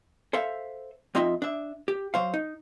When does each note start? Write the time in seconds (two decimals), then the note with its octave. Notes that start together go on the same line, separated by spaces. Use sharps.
0.33 A4 C5 E5 F5
1.15 F2 C4 D#4 F4 D#5 E5
1.42 D4 E5
1.88 G4
2.14 F#3 C5 F5
2.34 D#4